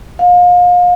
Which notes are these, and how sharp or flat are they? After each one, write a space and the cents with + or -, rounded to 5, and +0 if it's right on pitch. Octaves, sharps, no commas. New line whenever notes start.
F5 +35